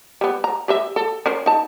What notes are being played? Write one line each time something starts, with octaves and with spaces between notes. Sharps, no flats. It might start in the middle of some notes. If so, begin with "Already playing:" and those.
G3 B3
A#5
G4 D#5 E5
A4
C#4 A#4 C5
D#4 A5